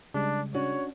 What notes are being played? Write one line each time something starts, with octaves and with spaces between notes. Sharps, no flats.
C#3 G3 G#3 D4
C#4 D4 F#4 C#5